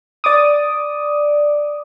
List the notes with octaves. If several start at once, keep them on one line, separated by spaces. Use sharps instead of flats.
D5 D6 D#6